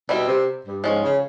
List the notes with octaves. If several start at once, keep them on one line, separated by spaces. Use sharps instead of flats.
B2 G3 C4 E4
C3
G2
G#2 F3 G#3 C#4
C#3